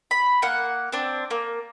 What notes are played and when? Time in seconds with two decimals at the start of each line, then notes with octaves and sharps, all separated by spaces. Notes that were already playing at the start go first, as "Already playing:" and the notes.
0.11 B5
0.42 A#3 F#5
0.93 C4 D4
1.31 A#3